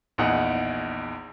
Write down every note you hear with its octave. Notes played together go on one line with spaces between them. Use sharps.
A#1 E2 D#4 F#5